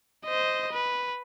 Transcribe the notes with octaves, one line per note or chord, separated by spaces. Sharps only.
C5 D#5
B4